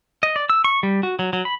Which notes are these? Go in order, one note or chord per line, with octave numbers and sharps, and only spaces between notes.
D#5
D5
E6
C#6
G3
F#4
F#3
F#3
B5